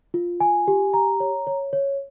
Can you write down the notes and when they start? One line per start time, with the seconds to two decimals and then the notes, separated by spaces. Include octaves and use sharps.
0.14 F4
0.40 G#5
0.68 G4
0.94 A#5
1.20 C#5
1.47 C#5
1.73 C#5